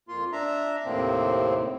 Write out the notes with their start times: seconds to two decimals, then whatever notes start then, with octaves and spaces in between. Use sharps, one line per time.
0.08 F2 A#3 F4 C6
0.32 D4 E5 A#5
0.85 D#2 A2 C3 A#3 C4